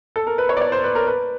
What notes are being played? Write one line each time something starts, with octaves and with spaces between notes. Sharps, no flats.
A4
A#4
B4
C#5
D5
C#5
C5
B4
A#4
B4